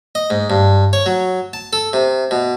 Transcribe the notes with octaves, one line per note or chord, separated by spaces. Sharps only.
D#5
G#2
G2
C#5
F#3
A5
A4
C3
B2